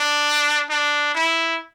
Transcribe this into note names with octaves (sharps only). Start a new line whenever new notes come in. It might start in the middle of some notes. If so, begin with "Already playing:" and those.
Already playing: D4
D4
E4